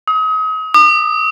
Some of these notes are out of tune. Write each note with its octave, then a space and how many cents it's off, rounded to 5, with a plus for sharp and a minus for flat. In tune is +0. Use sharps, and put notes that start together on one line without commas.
D#6 +35
D#6 -45